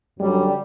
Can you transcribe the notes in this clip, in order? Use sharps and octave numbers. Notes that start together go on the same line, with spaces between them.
F#2 D3 F#3 G3